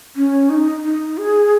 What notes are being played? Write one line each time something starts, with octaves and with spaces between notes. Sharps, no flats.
C#4
D#4
D#4
G#4